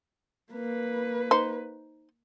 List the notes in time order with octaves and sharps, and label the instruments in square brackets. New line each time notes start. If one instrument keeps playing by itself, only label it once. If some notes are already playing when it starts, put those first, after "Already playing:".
[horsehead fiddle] A#3 B4
[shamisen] D#4 C5